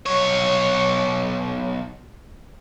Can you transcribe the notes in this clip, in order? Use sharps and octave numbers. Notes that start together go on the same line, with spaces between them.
B1 C#5